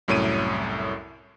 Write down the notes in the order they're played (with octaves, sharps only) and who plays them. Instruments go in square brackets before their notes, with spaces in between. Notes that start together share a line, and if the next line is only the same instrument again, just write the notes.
[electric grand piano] C2 F#2 A2 C#5 D7 D#7